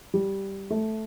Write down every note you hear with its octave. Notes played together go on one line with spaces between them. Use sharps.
G3
A3